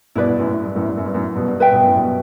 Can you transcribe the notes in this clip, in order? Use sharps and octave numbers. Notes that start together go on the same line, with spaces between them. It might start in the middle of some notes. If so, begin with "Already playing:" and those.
G2 B2 E4 B4 D5
G2 B2
F#2 A2
A2
G2
F#2 A2
G2
F#2
G2
F#2 A2
G2 B2
G2
G2 B4 E5 G5
G2 B2
F#2 A2
G2 B2